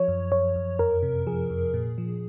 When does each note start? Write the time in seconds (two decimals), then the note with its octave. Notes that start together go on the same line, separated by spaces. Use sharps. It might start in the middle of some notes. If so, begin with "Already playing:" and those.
Already playing: F3 C#5
0.08 F#2
0.32 F#2 C#5
0.56 F#2
0.79 F2 A#4
1.03 C3
1.27 F3 G#4
1.50 F2
1.74 A#2
1.98 F3